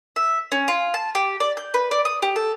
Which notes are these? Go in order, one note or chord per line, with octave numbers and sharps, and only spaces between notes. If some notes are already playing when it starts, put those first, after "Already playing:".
E5
C#4
F4
A5
G4
D5
G6
B4
D5
D#6
G4
A4